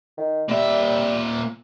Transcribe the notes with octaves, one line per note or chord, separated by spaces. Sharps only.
D#3
A#2 G3 E5